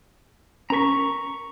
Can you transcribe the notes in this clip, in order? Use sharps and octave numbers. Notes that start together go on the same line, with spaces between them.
C#4 A#4 A#5 C#6 B6